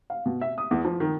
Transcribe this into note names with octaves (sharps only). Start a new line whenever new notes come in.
F5
B2
E5
D#6
E2
F3
D#3